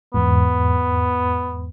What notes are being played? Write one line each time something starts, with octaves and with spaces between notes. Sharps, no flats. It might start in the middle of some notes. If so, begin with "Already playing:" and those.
E2 G#2 B3